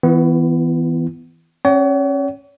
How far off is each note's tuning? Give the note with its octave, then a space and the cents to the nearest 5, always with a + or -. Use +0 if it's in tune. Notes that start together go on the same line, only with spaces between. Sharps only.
E3 -25 B3 +20 E4 +35
C#4 -25 C#5 +40 F#5 +40